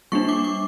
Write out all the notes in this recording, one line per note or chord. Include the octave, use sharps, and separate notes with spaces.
G3 A#3 D4 C#6
D6
D6